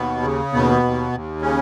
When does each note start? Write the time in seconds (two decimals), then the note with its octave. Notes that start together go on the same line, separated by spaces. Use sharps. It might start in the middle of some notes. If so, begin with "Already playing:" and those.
Already playing: D#2 B2 B3
0.23 C#3
0.53 D#2 B2 B3
0.83 D#2
1.12 D#2
1.42 C#3 C#4